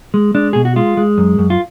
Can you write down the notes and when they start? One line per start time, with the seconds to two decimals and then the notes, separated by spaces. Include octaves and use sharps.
0.14 G#3
0.35 G#3 D4
0.53 B2 G#4
0.65 F#4
0.76 G#3 F4
0.97 G#3
1.18 F#2
1.39 F#2
1.50 F4